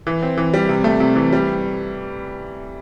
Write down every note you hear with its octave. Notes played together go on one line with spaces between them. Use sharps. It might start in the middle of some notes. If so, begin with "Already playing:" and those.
E3
C4
E3
G3
C3
A3
C3
E3
G3